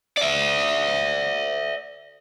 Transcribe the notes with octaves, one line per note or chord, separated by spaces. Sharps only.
D5 E5